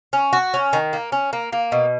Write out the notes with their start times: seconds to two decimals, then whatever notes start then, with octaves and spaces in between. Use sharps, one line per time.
0.13 C#4
0.33 F#4
0.54 C#4
0.73 D#3
0.93 A#3
1.12 C#4
1.33 A#3
1.53 A#3
1.72 B2